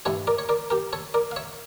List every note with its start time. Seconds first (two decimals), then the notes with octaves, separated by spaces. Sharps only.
0.05 G2 E3 G3 A4 C#5
0.27 A#4 D5
0.38 C#5
0.49 A#4 D5
0.70 G4 A#4
0.93 A4 C#5
1.14 A#4 D5
1.31 F5
1.36 C#5 E5